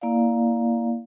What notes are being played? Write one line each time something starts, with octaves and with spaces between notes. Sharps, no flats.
A#3 E4 D5 F5